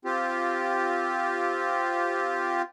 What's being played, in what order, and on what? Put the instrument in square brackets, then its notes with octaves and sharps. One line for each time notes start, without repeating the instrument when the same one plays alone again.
[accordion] C4 F4 G4